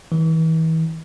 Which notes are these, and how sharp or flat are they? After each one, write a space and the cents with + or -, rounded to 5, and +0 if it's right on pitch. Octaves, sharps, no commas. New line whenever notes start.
E3 -40